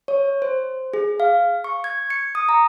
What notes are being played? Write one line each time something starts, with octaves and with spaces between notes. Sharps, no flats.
C#5
C5
G#4
F5
C#6
G#6
C#7
D#6
A#5